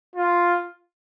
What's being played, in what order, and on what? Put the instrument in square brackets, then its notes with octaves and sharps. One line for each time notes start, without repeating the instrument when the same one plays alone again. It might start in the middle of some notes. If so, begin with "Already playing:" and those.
[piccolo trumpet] F4